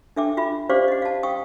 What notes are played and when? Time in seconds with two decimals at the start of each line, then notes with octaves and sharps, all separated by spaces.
0.16 D4 A4 E5 G5 D6
0.37 F4 E5 B5
0.70 C#4 G4 C5 D5 F5 D6
0.88 D#5 F#5
1.02 F5 A5
1.23 F5 G5 C#6 D#6